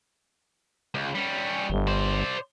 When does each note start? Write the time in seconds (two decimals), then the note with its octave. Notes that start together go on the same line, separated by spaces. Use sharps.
0.95 C#2
1.15 G3 C#4
1.70 G1
1.88 C5 D5